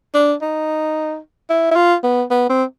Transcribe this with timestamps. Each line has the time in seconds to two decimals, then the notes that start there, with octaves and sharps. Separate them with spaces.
0.15 D4
0.42 D#4
1.50 E4
1.71 E4
1.76 F4
2.04 B3
2.31 B3
2.50 C4